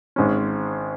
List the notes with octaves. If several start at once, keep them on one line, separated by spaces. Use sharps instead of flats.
G#1 G#2 G#3 C#4